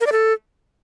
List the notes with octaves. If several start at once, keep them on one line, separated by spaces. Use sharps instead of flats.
A#4
D5
A4